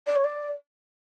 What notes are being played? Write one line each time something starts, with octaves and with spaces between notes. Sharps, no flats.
D5
C#5
D5